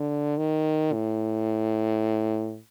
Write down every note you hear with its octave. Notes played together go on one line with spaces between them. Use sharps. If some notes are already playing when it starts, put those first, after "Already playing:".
Already playing: D3
D#3
A2